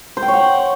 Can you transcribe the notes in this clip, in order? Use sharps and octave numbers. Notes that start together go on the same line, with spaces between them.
C5
G5
C#5
F#5